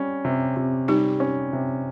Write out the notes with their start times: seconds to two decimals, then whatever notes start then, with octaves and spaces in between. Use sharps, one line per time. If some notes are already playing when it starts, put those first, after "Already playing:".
Already playing: G3 C#4
0.25 C3
0.57 C3
0.88 G3 D#4 G4
1.20 C#4
1.53 C3